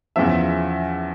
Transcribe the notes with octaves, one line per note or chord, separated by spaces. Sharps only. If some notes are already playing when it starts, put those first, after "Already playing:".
E2 C#3 F3 E5